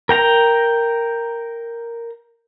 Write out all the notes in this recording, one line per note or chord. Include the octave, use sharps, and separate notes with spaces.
A#4 G5 A#5